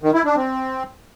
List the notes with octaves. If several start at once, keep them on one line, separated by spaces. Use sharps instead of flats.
D#3
E4
D4
C4